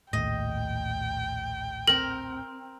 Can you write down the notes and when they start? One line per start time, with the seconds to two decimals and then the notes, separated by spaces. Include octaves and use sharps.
0.13 A#1 D#2 A2 D#5 G5
1.88 C4 A#4 F#7